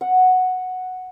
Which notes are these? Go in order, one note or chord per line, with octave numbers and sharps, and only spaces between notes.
F#5